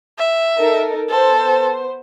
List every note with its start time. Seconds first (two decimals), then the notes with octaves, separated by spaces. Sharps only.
0.19 E5
0.58 D#4 A4 A#4
1.10 B3 A4 C5